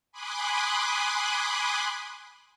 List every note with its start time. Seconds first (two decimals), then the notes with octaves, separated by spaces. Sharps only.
0.11 G#5 B5 C6 D6 D#6 F#6